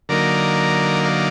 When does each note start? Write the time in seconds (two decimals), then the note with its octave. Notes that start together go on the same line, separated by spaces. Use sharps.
0.09 D3 F#3 A#3 D#4 A#4 D5
1.04 D5 F5